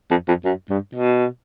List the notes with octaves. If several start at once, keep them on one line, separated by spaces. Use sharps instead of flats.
F2
F2
F#2
G2
B2